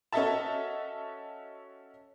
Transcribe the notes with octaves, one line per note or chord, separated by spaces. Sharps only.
C#4 F#4 A4 D#5 E5 A5